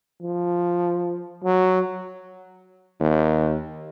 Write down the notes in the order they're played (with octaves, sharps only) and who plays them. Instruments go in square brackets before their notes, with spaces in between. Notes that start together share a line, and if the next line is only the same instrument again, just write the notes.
[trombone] F3
F#3
[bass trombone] D#2